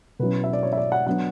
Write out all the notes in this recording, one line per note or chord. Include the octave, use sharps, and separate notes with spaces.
B2 F#3 C#4 E4 B4
E5
D5
C#5
E5
D5
F#5
F#3 B3 D4 F#5